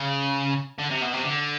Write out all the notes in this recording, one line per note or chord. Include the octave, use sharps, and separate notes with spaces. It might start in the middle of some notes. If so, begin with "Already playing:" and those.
Already playing: C#3
D3
C3
B2
C3
D3